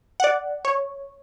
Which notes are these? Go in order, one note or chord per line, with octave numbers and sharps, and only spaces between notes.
D5 F#5
C#5